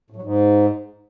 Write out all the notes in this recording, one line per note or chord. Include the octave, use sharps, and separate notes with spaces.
A2
F#3
G#2